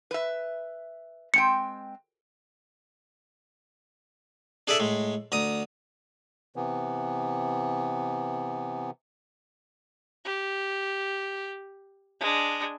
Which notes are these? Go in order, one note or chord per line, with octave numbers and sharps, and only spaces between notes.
B4 E5
G#3 C4 G5 C#7
D4 G#4 A4 D5 E5
A2 G#3
D2 A#5 D#6
C3 E3 B3
G4
G#3 D4